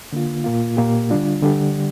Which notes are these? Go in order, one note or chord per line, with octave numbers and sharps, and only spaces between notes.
D3 A#3 F4
A#2 A#3 F4
A#2 A#3 G4
D3 G3 D4 F4
D3 G3 D4 G4